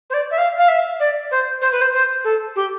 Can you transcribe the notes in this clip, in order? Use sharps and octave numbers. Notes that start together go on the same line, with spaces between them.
C5
D5
E5
F5
F5
E5
D5
C5
C5
B4
C5
C5
A4
G4